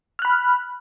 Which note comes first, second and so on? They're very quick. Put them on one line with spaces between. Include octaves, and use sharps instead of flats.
F6 F#6 B5